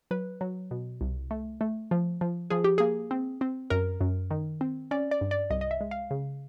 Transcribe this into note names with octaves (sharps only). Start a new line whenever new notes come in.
F#3 B4
F#3
B2
C2
A3
A3
F3
F3
F3 G#4
G4
A#3 G#4
C4
C4
F#2 A#4
F#2
D#3
C4
C#4 D5
D5
G2
D5
C2 D#5
D#5
E5
G#3
F5
C#3